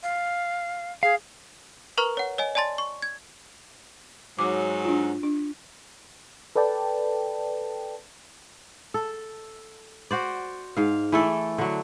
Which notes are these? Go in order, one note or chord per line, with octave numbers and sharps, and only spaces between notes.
F5
G#4 F5
A#4 B4 A#5 C#6 F6
C#5 F#5
C#5 D#5 G#5
D5 G#5 A5 C6 A6
C#6
G#6
G#2 F#3 D6
D4 F4
D4
A4 B4 D5 G5 A5
A4
F#4 C5 D5
G#2 F5
E3 A3 A4 D5
D3 F#3